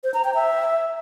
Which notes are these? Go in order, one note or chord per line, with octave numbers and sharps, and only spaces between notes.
C5
A#5
G5
E5